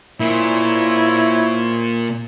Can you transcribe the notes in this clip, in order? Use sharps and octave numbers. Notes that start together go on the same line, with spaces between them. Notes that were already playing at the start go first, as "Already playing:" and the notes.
A#2 E4 C5 C#5